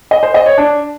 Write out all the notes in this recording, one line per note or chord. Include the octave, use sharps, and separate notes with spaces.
D#5
C5
D#5
C#5
D4